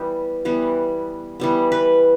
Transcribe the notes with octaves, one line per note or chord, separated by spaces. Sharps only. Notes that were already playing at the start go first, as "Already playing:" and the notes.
Already playing: E3 G3 B3 G4
E3 G3 B3
E3 G3 B3
B4